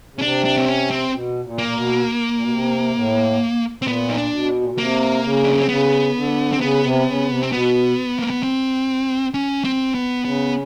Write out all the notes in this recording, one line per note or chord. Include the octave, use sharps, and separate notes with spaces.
C#3
C#4
C3 D4
D4
C4
C#4
C4
B2
A#2
A#3
A#2
B2
A#2
B2
C3
A2
C4
A#2 B3
D#4
D4
B2
A#2
B2
C3 A#3
C#3
D4
C#4
C4
C#3 B3
D3
C3 C4
C#3 B3
C3
C#3
C3
C4
B2 B3
A#3
B3
C4
C#4
C4
B3
C#3 B3